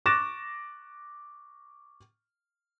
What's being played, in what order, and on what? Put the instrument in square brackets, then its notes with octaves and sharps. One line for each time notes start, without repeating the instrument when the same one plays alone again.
[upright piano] C#6 D6 F#6 A6 A#6 E7